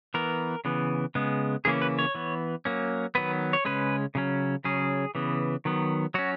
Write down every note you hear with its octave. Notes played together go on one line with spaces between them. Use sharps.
E3 B3 A#4
C#3 E3 B3
C#3 G#3 B3
C#3 E3 A#3 C#4 G#4
B4
C#5
E3 B3
F#3 A#3 C#4
D#3 F#3 B3 B4
C#5
C#3 G#3 C#4 B4
C#3 F#3 C#4
C#3 F#3 C#4 G#4
C#3 E3 B3
D#3 F#3 B3
F#3 C#4 F#4